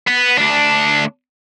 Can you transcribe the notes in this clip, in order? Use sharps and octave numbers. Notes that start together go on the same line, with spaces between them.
B3
D2 D4